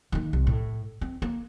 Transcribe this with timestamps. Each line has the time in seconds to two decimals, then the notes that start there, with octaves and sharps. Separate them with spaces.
0.12 D#3 A#3
0.33 C2
0.47 A2
1.01 C4
1.22 A#3